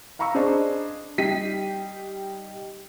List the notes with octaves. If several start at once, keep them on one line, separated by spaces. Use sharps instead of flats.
F5 A#5 B5 C#6 E6
D4 G#4 C5 D5 D#5
G3 D#4 G5 B6 C7 D#7